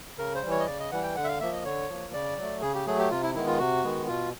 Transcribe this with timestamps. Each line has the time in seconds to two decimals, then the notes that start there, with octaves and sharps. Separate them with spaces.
0.18 C#3 A#4
0.35 C5
0.42 E3 G3
0.51 C#5
0.59 D#5
0.67 C#3 D5
0.80 D#5
0.91 E3 G3 F#5
1.03 G5
1.16 D3 F#5
1.24 E5
1.28 F5
1.40 F3 A#3 E5
1.53 D#5
1.65 D3 C#5
1.89 F3 A#3
2.13 C#3 D5
2.37 F#3 A3
2.62 C#3 G#4
2.75 G4
2.87 F#3 A3 G#4
2.98 G4
3.11 C3 F4
3.23 E4
3.35 D#3 G#3 B3 E4
3.47 F4
3.59 C3 F#4
3.84 D#3 G#3 B3
4.08 B2 F4